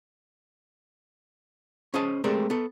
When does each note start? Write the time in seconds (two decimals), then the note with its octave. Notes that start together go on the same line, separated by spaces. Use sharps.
1.94 C#4 G#4 C5 D#5 A5
2.24 G#3 A3 C4 G4 A#4 D5
2.50 B3 A4